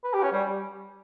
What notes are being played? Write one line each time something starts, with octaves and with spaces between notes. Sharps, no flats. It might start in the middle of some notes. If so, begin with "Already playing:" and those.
B4
G4
C#4
G3